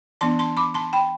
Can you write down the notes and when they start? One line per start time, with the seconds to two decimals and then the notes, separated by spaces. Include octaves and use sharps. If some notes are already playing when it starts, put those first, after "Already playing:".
0.21 E3 B3 D4 A5 C6
0.39 A5 C6
0.57 B5 D6
0.74 A5 C6
0.93 G5 B5